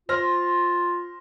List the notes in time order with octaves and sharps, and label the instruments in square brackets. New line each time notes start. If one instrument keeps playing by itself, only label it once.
[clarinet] F4 [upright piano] C5 F6 A#6